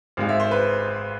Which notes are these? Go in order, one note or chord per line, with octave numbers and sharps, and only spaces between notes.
G#1 G#2 G#3 F5
E5
C5
B4